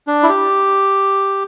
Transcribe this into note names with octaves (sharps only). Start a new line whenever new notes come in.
D4
E4
G4